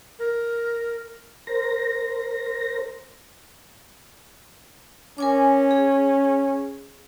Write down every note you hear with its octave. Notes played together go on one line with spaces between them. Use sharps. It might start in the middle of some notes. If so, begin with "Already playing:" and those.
A#4
A#4 C5 A#6
C#4 A#4 G#5 D6
G#4